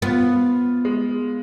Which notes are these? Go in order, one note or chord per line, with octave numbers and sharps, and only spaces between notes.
B3 F4
G#3